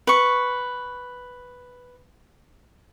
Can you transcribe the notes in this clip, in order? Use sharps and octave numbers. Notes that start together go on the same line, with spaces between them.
B4 C#6